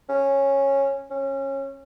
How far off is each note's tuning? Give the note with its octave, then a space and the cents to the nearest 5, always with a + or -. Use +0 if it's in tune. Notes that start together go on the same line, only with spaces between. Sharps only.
C#4 -10
C#4 -25